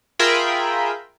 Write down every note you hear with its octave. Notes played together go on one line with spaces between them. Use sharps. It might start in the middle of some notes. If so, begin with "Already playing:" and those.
F4 G#4 A#4 E5 G5 B5